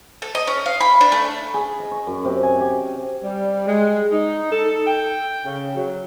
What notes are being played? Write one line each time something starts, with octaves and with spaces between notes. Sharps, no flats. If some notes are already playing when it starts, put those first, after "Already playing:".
A4
D#5
C#4
F5
B5
D4
A3
G#4
D#5
C#6
F#2
C3
G#5
G4
G3
G#3
D#4
A4
G5
C#3
F#3